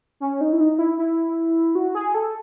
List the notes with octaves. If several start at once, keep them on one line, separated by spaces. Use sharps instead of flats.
C#4
D#4
E4
D#4
E4
E4
F#4
G#4
A4